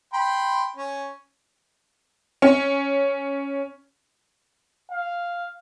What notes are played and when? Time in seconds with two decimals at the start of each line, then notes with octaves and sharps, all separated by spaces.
0.13 G5 B5 C6
0.77 C#4
2.42 C#4
4.91 F5